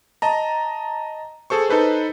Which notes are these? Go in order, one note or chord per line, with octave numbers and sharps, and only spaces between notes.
D#5 A5 A#5
G#4 A4 C5 C#6
D#4 A4 B4 C5